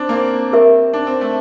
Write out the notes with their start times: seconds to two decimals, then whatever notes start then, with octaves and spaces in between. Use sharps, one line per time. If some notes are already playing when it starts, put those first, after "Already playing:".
Already playing: C4 D4
0.09 A#3
0.13 C4
0.53 G4 A#4 E5
0.93 D4
1.07 C4
1.21 A3